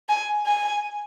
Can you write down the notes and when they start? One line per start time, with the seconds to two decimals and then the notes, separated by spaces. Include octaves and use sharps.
0.09 G#5
0.46 G#5